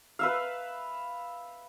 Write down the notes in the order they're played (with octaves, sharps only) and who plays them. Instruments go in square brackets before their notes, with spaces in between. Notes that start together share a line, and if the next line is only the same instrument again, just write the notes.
[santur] B4 E5 F5